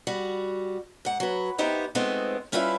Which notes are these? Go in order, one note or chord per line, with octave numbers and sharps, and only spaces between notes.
G3 F#4
G#2 F#5
F#3 B4
B3 C4 D#4 E4 G4 C5
F3 G#3 A3 B3 C4 D#4
G3 C#4 E4 F4 B4 E5